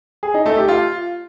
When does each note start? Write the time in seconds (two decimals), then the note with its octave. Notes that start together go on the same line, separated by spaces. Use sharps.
0.23 G#4
0.34 D#4
0.46 A3
0.57 G4
0.68 F4